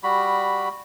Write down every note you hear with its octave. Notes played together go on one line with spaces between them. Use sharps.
G3 F#4 B5